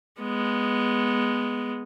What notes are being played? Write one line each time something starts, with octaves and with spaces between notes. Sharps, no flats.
G#3 B3